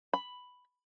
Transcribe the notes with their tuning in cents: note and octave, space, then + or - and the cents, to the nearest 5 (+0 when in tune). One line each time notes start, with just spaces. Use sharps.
B5 +5